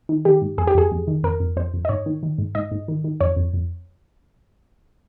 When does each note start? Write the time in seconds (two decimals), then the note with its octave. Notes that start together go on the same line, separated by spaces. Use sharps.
0.09 D#3
0.25 D#3 G4
0.42 G#2
0.58 F2 G#4
0.67 G4
0.74 F2 G#4
0.92 F2
1.07 D#3
1.23 F2 A#4
1.40 F2
1.56 F2 C5
1.74 F2
1.85 D#5
1.89 G#2 C#5
2.06 D#3
2.23 D#3
2.38 G#2
2.55 G#2 D#5
2.71 G#2
2.88 D#3
3.04 D#3
3.20 F2 C#5
3.36 F2
3.53 F2